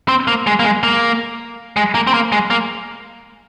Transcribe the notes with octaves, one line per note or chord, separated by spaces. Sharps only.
C4
A#3
G#3
A#3
G#3
A#3
G#3
A#3
C4
A#3
G#3
A#3